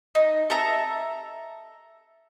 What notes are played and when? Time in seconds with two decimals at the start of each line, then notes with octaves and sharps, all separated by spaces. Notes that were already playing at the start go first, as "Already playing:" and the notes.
0.15 D#4
0.50 A4 E5 A#5